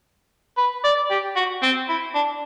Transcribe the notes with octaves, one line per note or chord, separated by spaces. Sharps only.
B4
D5
G4
F#4
C4
E4
D4